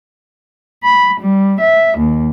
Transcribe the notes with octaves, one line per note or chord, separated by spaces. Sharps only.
B5
G3
E5
D#2